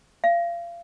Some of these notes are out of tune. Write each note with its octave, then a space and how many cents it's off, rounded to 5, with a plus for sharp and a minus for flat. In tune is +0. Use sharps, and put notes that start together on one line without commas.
F5 -30